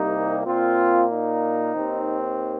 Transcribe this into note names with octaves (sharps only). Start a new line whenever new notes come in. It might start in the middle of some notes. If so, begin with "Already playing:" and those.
Already playing: C2 C3 G3 A#3 D#4
A#2 A#3 C4 F4
D#4
D#2 D#3 C4